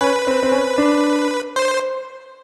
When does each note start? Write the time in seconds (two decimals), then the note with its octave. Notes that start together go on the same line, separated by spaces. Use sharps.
0.01 C#4 B4
0.27 C4
0.43 C4
0.52 C#4
0.78 D4
1.56 C5